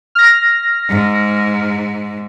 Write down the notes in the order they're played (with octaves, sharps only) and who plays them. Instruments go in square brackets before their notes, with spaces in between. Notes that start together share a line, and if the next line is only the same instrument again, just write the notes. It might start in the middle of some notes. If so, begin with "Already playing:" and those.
[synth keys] F6 A#6
[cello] G#2